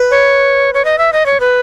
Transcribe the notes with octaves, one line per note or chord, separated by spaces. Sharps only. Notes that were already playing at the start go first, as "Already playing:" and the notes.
Already playing: B4
C#5
C#5
D#5
E5
D#5
C#5
B4